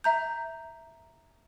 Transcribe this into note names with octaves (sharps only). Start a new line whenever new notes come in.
E5 A#5 G6